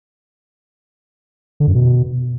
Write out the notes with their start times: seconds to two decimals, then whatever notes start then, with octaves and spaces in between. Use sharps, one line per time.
1.60 D3
1.67 F#2
1.75 B2